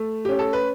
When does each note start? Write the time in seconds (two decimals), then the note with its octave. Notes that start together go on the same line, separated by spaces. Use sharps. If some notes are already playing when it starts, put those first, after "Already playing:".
Already playing: A3
0.25 C#4 G4
0.39 A4
0.53 B4